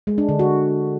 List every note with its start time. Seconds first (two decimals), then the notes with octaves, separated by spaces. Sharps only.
0.07 G#3
0.18 D4
0.29 D3
0.39 F#4